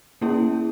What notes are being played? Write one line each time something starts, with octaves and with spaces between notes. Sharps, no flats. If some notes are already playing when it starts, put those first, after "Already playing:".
A#3 C#4 E4 G#4